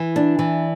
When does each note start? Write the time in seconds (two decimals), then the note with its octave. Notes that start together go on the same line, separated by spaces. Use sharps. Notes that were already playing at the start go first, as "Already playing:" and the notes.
Already playing: E3
0.16 D4
0.39 E3